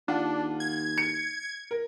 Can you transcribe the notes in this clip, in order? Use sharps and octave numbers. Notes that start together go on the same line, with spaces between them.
D#2 D4 F4 F#5
G#6
C#7
A#4